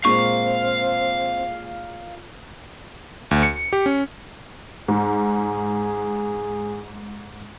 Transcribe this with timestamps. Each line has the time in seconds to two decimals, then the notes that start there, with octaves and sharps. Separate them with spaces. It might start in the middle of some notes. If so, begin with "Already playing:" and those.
0.05 A#2 G#3 A#3 C4 F5 C#6
3.31 D2
3.43 C#7
3.73 G4
3.86 C#4
4.88 G#2 G#4